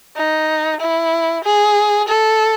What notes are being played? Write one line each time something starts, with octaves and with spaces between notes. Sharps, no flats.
D#4
E4
G#4
A4